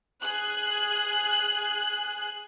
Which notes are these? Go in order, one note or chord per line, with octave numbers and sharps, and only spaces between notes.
G#4 F#6